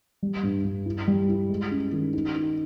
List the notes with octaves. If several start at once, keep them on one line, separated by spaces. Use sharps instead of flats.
G3
G2
G2
E4
G3
E4
G#3
C#4
D#3
D#4
D#4